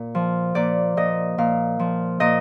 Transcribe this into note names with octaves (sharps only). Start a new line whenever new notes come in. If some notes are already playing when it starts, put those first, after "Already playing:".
Already playing: A#2
F3
A#2 D5
A#2 D#5
A#2 F5
F3
A#2 D#5